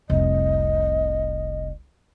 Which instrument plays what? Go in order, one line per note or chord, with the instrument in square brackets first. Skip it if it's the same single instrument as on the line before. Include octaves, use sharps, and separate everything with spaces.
[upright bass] F1 C2 [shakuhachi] D#5